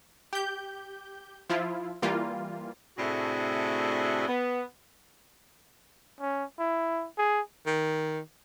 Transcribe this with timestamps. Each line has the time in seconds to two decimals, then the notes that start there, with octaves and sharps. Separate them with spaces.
0.33 G4 G6
1.50 F3 E4 F4
2.02 E3 G3 A#3 F4
2.97 A2 C3 A3 D4 F#4 G#4
4.27 B3
6.21 C#4
6.59 E4
7.18 G#4
7.67 D#3